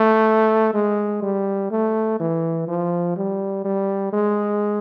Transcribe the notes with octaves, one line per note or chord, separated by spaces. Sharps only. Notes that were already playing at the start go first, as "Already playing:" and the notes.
Already playing: A3
G#3
G3
A3
E3
F3
G3
G3
G#3